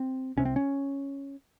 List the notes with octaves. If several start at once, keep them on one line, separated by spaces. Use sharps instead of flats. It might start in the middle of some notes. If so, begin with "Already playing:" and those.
Already playing: C4
C2 C3 C#4
C4
C#4